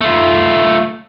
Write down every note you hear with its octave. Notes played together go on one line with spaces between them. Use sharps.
A3 F4